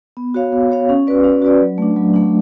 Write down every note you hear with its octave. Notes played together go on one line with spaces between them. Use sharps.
B3
F#4 C#5 F5
B3
F#4 C#5 F5
C#4
F#4 B4 D5
C#4
F#4 B4 D5
F#3
A3 D4
F#3
A3 D4